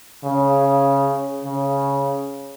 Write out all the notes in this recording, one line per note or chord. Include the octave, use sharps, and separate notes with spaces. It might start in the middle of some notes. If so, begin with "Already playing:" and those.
C#3
C#3